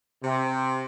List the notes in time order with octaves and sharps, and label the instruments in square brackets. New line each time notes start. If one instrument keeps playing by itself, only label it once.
[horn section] C3